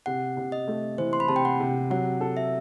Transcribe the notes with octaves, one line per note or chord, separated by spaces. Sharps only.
C3 F#5
C3
D#5
A3
E3 C5
C6
B5
C3 A5
G5
F#5
C3
F#3 F#5
A4
E5